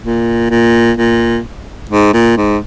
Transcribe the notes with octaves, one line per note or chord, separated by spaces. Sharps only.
A#2
A#2
A#2
G#2
A#2
G#2